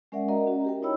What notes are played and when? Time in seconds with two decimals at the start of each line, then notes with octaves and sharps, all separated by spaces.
0.12 G#3 C#4 A#4 D5 E5 F#5
0.29 F#4 A#4 D#5 A#5
0.47 C#4 F#4
0.65 G4 A#4 G5
0.82 D#4 E4 C#5 D#5 B5 E6